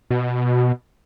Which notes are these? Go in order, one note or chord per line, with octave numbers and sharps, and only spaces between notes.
B2